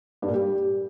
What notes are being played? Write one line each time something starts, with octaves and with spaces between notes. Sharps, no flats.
G2
A#2
G3